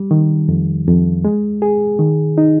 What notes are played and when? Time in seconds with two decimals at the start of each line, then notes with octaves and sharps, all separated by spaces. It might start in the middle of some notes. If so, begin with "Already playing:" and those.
Already playing: G3
0.11 D#3
0.49 F2
0.87 F2
1.25 G#3
1.62 G#4
1.99 D#3
2.38 D#4